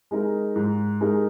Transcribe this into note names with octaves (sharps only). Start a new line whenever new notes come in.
G#3 D#4 A#4
G#2
G#3 D#4 A#4